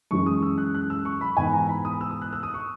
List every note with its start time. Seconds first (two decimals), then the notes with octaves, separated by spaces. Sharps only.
0.11 F#2 E3 G#3 C#4 C#6
0.26 D#6
0.42 E6
0.58 F#6
0.74 F#6
0.90 E6
1.05 C#6
1.21 B5
1.37 G#2 E3 B3 G#5
1.53 A#5
1.69 B5
1.85 D#6
2.01 E6
2.11 D#6
2.22 F#6
2.33 E6
2.43 D#6
2.54 C#6